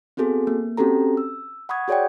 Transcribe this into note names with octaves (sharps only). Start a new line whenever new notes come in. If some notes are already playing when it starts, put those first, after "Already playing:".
B3 C4 F#4 G#4 A4
A#3
C4 C#4 F#4 G4 A4 A#5
E6
F#5 B5 C#6 D#6 G#6
F#4 G#4 C#5 D5 F#5 G5